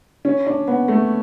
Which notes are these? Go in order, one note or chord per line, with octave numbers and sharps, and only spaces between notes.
C#4
D4
B3
A3